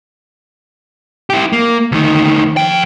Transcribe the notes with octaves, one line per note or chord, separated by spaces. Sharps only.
E4 G4
A#3
D2 D#3
F2 G5